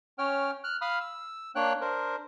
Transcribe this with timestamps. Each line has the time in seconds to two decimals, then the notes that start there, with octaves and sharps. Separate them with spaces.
0.18 C#4 C#5 G5 F6
0.64 F6 F#6
0.81 F5 B5 D#6 F6
1.00 E6
1.55 A#3 D4 C#5 G5 F#6
1.81 D4 A#4 C5